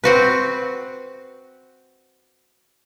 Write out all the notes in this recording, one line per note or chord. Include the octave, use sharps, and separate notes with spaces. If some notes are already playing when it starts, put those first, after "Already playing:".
C4 F#4 B4